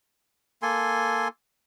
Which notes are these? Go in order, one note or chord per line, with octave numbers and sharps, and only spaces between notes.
A#3 A4 G#5 C6